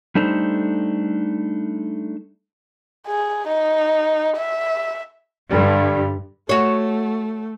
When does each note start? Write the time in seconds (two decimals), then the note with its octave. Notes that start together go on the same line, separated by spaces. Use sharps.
0.15 G3 A3 D4 D#4 A4 C5
3.07 G#4
3.47 D#4
4.37 E5
5.51 G2 D3 G3
6.49 A3 F#4 C#5